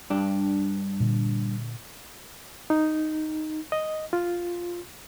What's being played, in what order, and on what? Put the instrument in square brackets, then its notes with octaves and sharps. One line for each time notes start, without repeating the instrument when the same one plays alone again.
[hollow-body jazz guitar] G2 D4
[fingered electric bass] A#2 D3
[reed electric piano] D#4
D#5
F4